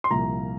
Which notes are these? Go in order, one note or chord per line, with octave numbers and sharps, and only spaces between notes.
C6
C2 A#2 F3 A#5